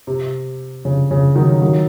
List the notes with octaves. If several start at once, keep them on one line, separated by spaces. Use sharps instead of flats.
C3
C#3
C#3
D#3 F#3
D#3 F#3